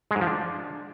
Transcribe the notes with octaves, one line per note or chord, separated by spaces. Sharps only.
G#3
G#2
F3
D4